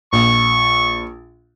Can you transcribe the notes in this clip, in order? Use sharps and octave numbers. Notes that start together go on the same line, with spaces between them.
A#1 C#6